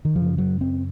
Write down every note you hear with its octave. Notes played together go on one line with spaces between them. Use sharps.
D#3
F#2 F3
C#3
F#3
C4